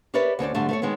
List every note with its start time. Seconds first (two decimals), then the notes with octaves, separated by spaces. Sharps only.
0.14 G4 A#4 B4 C#5 D5 E5
0.39 D2 C#4 C5 D5
0.55 G#2 D3 G3 A3
0.69 A3 C5 C#5
0.82 D#3 G#3 B3 C#4